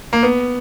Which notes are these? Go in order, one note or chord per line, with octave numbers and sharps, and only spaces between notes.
A#3
B3